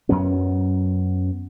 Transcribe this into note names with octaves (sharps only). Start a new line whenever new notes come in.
F#2 F#3 B3 C#4